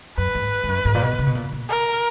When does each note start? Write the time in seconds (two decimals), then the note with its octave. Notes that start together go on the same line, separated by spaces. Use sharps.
0.17 F#2 B4
0.35 G#2
0.64 G#2
0.68 F#2
0.85 G#2
0.95 A#2
1.01 B2
1.19 C#3
1.27 B2
1.35 A#2
1.52 A#2
1.69 A#4